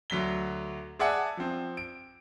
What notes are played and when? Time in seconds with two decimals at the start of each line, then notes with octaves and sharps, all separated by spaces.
0.10 D2 F#3 B6 G7
0.99 G#4 D5 E5 F#5 G#5 A5
1.37 F3 C4
1.77 D7